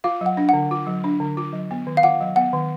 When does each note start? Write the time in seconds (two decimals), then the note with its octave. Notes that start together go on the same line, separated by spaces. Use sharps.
0.04 F4 F5
0.21 F#3 F#5
0.37 D4
0.49 D3 F#5
0.71 F4
0.87 F#3
1.04 D4
1.20 D3
1.37 F4
1.53 F#3
1.71 B3
1.87 D#3
1.97 F5
2.03 F4 F#5
2.21 F#3
2.36 B3 F#5
2.53 D#3